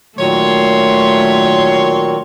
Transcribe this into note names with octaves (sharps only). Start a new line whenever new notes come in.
A#2 D#3 F#3 A3 C#5 C6